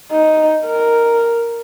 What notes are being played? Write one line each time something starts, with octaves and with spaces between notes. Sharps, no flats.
D#4
A#4